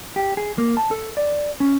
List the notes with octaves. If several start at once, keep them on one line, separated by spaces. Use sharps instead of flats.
G4
G#4
A#3
A5
A4
D5
C#4